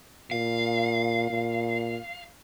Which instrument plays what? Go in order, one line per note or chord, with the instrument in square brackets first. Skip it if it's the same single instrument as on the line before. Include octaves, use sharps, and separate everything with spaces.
[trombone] A#2 [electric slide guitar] F5
[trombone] A#2